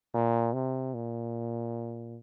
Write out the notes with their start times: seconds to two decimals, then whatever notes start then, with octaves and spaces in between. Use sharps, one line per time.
0.14 A#2
0.54 C3
0.94 A#2